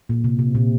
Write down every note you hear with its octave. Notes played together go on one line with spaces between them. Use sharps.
A#2
C3
C3
A#2